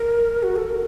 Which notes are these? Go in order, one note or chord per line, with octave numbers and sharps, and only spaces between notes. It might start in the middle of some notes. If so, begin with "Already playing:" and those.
Already playing: A#4
F#4
A4
A#4